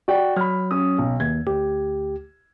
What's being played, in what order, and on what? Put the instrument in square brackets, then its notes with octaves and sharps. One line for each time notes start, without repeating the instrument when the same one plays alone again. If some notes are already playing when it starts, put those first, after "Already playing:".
[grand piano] F#4 D5 G5
[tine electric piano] F#3 [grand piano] B5 F6
[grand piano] C#4 D#6
B1
[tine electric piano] D#2 [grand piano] G#6
[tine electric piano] D2 G4